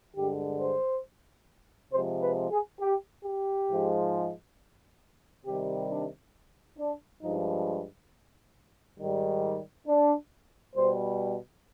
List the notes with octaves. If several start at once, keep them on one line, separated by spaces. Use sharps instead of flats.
G2 D3 G#3 G4
C5
C3 F3 G#3 C5
B4
G#4
G4
G4
G#2 F3 G#3
C3 D#3 G3 G4
D4
D4
G2 F3 G#3 D#4
G#2 D#3 G3
D4
B2 G3 C5